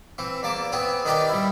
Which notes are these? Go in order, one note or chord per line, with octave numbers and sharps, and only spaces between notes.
E3 C4
E2 A#3 A5 D6
B3 C4 G#4
D#3 D#4 G4 B4 D5 F5
G3 E4